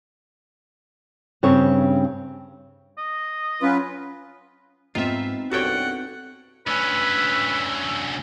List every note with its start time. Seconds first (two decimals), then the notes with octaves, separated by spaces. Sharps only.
1.43 G2 C#3 C4 C#5
2.98 D#5
3.62 F#3 C#4 F4 B4
4.95 G#2 B3 C4 D#4 F4 E5
5.51 C2 G2 F#4 A4 C#5 F#5 G5
6.67 D2 C#4 B4 E6